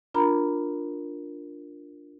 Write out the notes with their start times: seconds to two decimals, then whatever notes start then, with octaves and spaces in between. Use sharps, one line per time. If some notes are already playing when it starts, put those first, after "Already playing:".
0.14 D4 F4 A#4 A#5 B5